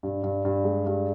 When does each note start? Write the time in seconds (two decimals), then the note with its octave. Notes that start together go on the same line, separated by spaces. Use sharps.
0.03 G2
0.23 G2
0.45 G2
0.64 G#3
0.87 G2